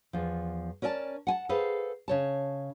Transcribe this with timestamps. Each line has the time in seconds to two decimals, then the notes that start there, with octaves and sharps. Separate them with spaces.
0.13 E2 F3
0.82 C#4 A#4 D5 D#5 A5
1.27 F#5 G#5 A5
1.49 G#4 A4 B4 C5 F5
2.08 C#3 C#5 A5